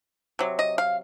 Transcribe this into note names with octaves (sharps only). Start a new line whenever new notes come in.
C3 F#3
D#5
F5